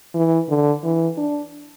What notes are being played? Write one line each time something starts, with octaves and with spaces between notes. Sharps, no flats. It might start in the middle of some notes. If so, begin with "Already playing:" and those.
E3
D3
E3
D4